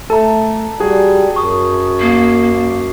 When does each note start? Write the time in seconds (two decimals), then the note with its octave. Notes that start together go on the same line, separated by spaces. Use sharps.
0.10 A3 A4 A5 A#5
0.80 G3 F#4 G#4
1.36 F#2 C#6 D#6
2.01 A#3 C7